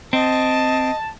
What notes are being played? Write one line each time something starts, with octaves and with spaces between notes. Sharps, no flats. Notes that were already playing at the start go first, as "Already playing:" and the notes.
C4 D#5 A5